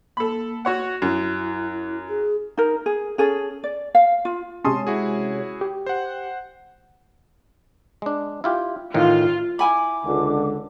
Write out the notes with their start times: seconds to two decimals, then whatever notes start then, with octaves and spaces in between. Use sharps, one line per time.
0.17 A#3 A4 B5
0.65 F#4 C#5 F#5
1.02 F#2 E4
2.08 G#4
2.57 D#4 A#4
2.86 G#4
3.18 C#4 G#4 A4
3.64 D5
3.95 F5
4.25 F4
4.64 C3 G#3 C#4 A5 C6 D#6
4.87 E4 F#4 G#4
5.61 G4
5.86 C5 F#5
8.02 G#3 D4
8.44 E4 F4 G4
8.94 A1 A2 D#3 F4
9.59 E4 G#5 B5 D6
10.05 C#2 D3